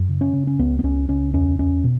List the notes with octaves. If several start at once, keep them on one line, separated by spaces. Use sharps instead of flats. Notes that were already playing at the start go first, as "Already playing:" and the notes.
Already playing: F#2
C#3
C#4
C#3
C#4
C#2 B3
B3
C#2 C#4
C#2 C#4
E2 C#4
E2 C#4
B2